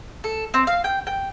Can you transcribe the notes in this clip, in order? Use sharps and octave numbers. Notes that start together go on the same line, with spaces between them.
A4
C4
F5
G5
G5